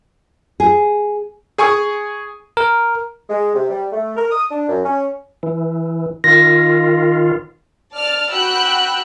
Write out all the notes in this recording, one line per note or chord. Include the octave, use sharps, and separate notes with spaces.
G#4
G#4 G#5 C#6 D#6
A#4
G#3
C3
G3
A3
A#4
D#6
D4
F#2
C#4
E3
D#3 F4 A#6
D5 A5 F6
F#4 G5 B5 E6 F#6